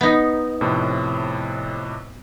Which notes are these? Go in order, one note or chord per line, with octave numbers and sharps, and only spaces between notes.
B3 D#4
F2 A2 C3